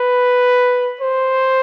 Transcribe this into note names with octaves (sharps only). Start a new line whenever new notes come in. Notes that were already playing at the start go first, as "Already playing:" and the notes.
Already playing: B4
C5